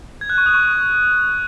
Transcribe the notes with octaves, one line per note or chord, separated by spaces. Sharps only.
G#6
F#6
C#6
D#6
C#6